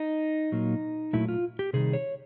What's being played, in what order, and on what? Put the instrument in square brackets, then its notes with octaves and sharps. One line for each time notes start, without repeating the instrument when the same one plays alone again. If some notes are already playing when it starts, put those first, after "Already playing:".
Already playing: [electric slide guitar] D#4
A#2 F#3 A#3
A#2 F#3 A3 E4
F4
G4
C3 D#3 G3 G#4
C#5